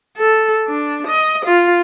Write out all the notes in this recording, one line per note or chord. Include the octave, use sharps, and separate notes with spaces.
A4
D4
D#5
F4